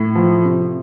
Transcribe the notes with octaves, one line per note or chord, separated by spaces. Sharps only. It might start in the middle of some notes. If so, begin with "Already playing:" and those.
Already playing: A2
F3
C3